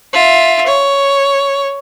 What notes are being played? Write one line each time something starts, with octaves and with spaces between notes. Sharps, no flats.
F4 E5
C#5